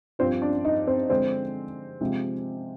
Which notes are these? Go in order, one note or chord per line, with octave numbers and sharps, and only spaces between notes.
G2 F3 C4 F4 C5
D4 D5
D#4 D#5
C4 C5
D3 F3 G#3 C4 C5
C3 F3 G#3